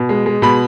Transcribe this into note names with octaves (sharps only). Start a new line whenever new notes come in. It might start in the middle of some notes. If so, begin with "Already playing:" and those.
Already playing: B2
G#3
G#3
B2 B5